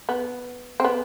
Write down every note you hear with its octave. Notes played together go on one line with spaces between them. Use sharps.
B3
C4
B3